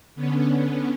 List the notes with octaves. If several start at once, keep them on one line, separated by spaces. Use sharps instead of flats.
D3 B3 C#4